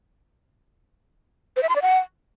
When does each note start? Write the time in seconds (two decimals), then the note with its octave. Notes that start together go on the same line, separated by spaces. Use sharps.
1.56 C5
1.63 E5
1.69 C6
1.76 D5
1.82 F#5